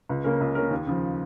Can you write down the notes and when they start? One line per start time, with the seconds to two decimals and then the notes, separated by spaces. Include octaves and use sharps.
0.09 C#2
0.24 C#3 A#3 C#4 A#4
0.41 C#2
0.55 C#3 A#3 C#4 A#4
0.71 D#2
0.86 C#3 F3